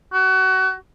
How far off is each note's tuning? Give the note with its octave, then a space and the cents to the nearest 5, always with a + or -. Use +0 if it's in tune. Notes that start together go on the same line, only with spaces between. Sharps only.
F#4 +30